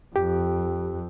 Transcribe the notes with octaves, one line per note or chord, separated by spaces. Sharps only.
F2 G4